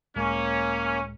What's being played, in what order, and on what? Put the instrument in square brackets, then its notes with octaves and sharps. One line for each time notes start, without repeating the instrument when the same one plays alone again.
[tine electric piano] C#2 A2 G#3 [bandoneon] A#3 [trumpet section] C#4